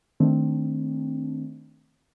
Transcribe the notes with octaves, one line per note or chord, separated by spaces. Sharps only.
D#3 A3 C4 D4